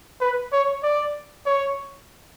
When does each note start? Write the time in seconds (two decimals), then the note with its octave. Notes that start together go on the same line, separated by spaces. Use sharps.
0.21 B4
0.52 C#5
0.83 D5
1.46 C#5